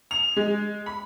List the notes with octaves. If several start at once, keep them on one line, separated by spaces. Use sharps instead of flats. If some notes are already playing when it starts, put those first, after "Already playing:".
F7
G#3
B5